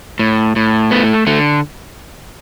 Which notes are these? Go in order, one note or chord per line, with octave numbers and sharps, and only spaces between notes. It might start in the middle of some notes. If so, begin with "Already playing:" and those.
A2
A2
A3 B3
D3 A3